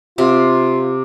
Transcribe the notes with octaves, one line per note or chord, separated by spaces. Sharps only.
C3 F4